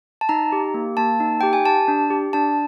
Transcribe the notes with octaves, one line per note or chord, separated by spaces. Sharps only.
A5
D#4 A#5
G4
A#3
A#3 A5
D#4
G4 G5
G#5
G4 A5
D4
G4
D4 A5